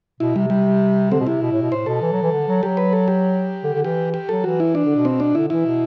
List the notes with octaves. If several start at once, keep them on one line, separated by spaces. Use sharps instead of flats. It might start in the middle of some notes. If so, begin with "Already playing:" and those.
B2 E4
C3 G3
G3
D3 C4
B2
C3 E4
B2
A2
B2
A2 C5
B2 A4
E3
F#3
E3
D3
F#3
F#3 G4
B4
A4
G4
D3
D3
E3 G4
G4
F#3 A4
E3 F#4
E4
E3 D4
D3
B2
C4
D4
D3 E4
E3 E4
B2